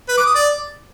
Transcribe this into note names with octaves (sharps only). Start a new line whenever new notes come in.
B4
D6
D#6
D5